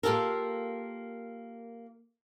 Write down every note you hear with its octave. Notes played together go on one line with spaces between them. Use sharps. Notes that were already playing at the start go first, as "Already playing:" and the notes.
A#3 F4 G4 A4 A#4